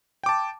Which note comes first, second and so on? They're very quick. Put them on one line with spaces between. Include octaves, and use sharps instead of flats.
G5 D6 A5